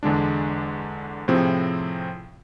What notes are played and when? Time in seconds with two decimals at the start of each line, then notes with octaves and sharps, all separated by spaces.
0.03 E2 D3 G#3 D4
1.28 A2 C3 F3 C4 G#4